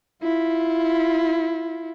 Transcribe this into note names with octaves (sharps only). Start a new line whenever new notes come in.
E4 F4